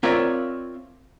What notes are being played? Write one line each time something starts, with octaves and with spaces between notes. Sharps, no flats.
C4 F4 A#4 C#5 D5 E5